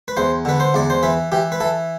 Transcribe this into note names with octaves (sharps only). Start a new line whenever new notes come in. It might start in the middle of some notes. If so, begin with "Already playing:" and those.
B4
E2 C5
D3 B4
C5
E2 D5
C5
E3 B4
E3 G4
B4
E3 A4